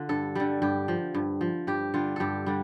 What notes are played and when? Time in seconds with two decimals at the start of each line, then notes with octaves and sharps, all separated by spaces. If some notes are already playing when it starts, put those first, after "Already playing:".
Already playing: D3 F4
0.09 G2 A4
0.35 D3 G3
0.62 G2 G4
0.88 F3
1.15 G2
1.41 F3
1.67 G2 G4
1.94 D3 G3 F4
2.16 G2 G4 A4
2.46 D3 G3